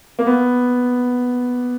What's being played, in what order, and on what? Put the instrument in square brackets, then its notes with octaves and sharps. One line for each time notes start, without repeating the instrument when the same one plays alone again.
[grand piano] A#3
B3